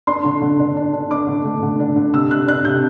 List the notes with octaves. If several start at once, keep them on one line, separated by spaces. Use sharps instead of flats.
D4 C6
D3
D3
D4
D4
D4
D4 D6
D3
A3
D3
D4
D3
C3 E6
C3 F#6
D4 F#6
C3 G6